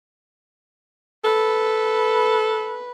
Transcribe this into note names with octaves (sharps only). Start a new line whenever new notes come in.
A4 B4